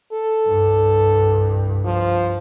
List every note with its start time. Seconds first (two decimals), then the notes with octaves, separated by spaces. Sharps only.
0.13 A4
0.47 C2 G2
1.85 F3